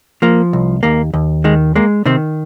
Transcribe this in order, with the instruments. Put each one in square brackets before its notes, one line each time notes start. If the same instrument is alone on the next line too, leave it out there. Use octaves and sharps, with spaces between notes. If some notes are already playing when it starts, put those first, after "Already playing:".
[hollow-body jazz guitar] F3 A#3
C2
D#2 A#3
D#2
D#3 G#3
G#3 A#3
C3 D#3 C4